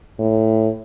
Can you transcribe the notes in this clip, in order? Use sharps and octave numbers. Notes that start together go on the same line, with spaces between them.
A2